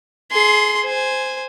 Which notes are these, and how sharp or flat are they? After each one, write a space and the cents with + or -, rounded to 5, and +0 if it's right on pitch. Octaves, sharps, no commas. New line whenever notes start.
G#4 +25 C6 -10
C5 -10 G#5 +0